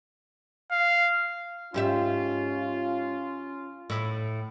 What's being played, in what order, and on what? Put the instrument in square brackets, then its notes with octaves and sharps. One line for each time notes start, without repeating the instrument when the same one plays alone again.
[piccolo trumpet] F5
[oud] G#2 G4 E5 [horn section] C#4 F4
[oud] A2 E4